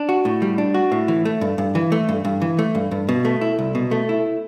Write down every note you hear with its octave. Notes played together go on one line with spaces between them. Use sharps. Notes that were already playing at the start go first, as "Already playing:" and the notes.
Already playing: D4
F#4
A2
G3
D4
F#4
A2
E3
A3
G2
G2
E3
A3
G2
G2
E3
A3
G2
G2
B2
A3
E4
C2
B2
A3
E4